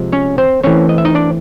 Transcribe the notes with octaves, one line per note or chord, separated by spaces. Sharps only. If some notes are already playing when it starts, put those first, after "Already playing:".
Already playing: C3 F3 G#3
C#4 C#5
C4 C5
E3 A3 C4 C#4 C#5
D#5
E5
D#4 D#5
D4 D5